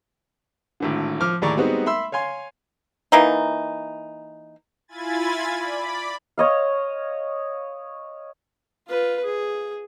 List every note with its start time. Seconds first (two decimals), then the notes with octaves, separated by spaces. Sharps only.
0.80 G#1 A2 D3
1.21 F3 D6 F6
1.42 D#2 A2 G#4 D5 A#5 C#6
1.57 G3 G#3 B3 C4 D#4 F#4
1.86 E5 B5 C6 E6
2.12 C#5 F5 G#5 C6
3.12 E3 A#3 D#4
4.88 E4 F4 G#5 B5 G#6 A6
5.59 D5 B5
6.38 C#5 D#5 F5
8.88 F4 B4
9.24 G#4